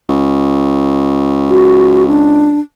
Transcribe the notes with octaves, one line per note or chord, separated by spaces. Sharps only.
C#2
F#4
D4